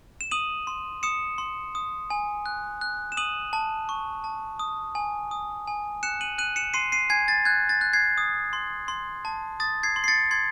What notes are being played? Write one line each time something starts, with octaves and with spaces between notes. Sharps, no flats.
E7
D#6 D#7 F#7
C6
D#6 C#7 E7
C6
D#6
G#5
F#6
F#6
E7
D#6 D#7 F#7
A5
C#6
A5
D#6
G#5
D#6
G#5
F#6 C#7 E7
D#7 F#7
F#6 D#7 F#7
C#7 E7
C6 C7 D#7
C7 D#7
G#5 G#6 C7
A6
F#6 G#6
A6
F#6
G#6 C7
D#6
C6
C6
A5
D#6 A6
G#6 C7
C6
C7
A6 C#7
C6 G#6 C7